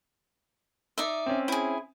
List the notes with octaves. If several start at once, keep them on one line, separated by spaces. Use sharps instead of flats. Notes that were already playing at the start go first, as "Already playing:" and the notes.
D#4 D5 E5
C4 C#4
E4 G#4